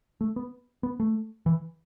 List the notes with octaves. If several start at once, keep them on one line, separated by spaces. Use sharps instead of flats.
A3
B3
B3
A3
E3